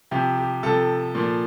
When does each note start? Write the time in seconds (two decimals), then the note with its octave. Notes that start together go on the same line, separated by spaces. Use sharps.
0.11 C3 F3 G4
0.38 G4
0.63 C3 F3 A4
1.15 A#2 F3